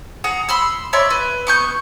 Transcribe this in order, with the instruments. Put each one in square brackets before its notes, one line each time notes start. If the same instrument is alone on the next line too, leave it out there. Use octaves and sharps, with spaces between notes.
[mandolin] G#4 F#5 A#5
B5 C6 E6
C#5 D5 E5 C6
B4
B3 C#6 G6